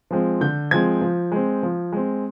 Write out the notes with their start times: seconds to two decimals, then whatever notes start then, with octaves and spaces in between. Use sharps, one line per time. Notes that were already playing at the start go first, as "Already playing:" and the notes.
0.11 F3 G#3 C4
0.41 D3 G6
0.71 F3 G#3 C4 G#6
1.01 F3
1.32 G#3 C4
1.63 F3
1.92 G#3 C4